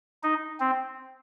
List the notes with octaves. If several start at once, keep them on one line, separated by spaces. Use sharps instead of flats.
D#4
C4